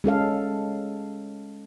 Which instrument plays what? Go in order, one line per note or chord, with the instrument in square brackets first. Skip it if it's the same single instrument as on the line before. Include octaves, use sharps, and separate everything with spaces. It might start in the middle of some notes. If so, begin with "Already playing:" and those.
[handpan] G#3 C#4 A4 F5